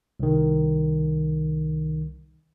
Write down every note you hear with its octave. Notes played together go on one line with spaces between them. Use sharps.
C2 D#3